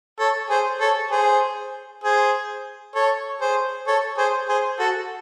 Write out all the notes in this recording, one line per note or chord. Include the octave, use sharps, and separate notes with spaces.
A4 C#5
G#4 C5
A4 C#5
G#4 C5
G#4 C5
A4 C#5
G#4 C5
A4 C#5
G#4 C5
G#4 C5
F#4 A4